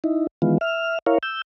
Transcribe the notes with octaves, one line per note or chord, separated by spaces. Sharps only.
D#4 E4
D#3 E3 G#3 B3 F4
E5 F6
E4 A#4 C#5 F5
E6 G6